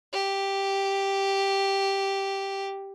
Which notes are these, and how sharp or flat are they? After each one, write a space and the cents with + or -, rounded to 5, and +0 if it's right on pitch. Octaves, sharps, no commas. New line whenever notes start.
G4 +0